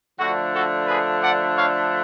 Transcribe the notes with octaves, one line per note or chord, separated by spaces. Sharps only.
D3 F3 A3 D4 F#4
F#4 A4
G#4 B4
D5 F#5
C#5 F5